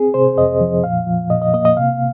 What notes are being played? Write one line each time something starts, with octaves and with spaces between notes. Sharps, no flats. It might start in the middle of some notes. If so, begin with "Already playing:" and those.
Already playing: C4 G#4
C3 C5
F2 D#5
F3
A#2 F5
F3
A#2 D#5
D#5
A#3 D#5
D#5
C3 F5